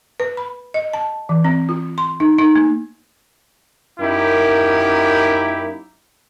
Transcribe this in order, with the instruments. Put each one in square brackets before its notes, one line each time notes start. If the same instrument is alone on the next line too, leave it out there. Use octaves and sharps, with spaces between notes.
[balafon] B4
B5
D#5
A5
E3
C4
F4
C6
D#4
D#4
A#3
[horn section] F#2 A#3 D#4 E4 G4